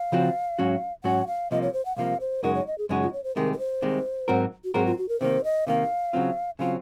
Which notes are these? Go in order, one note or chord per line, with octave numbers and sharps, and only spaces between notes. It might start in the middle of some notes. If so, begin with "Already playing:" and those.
Already playing: F5
C#3 F3 C4 F#4 C5
G#2 F#3 C#4 F#4
G#2 F#3 C#4 F#4 F#5
F5
C2 C3 F3 A#3 D#5
C#5
C5
F#5
C2 C3 F3 A#3 F5
C5
F#2 C#3 G#3 D#4 F#4 A#4
C#5
D#5
G#4
F#2 C#3 G#3 D#4 F#4 G#4
F4
C#5
C5
C2 C3 D#3 G#3 A#4
A#4
C5
C2 C3 D#3 G#3
G#2 F#3 C4 F#4 A#4
F#4
G#2 F#3 C4 F#4 G#4 A#4
F4
F#4
A#4
C3 D#3 A#3 C5
D#5
C3 D#3 A#3 F5
C#3 F#3 C4 F4
C#3 F#3 C4 F4 F5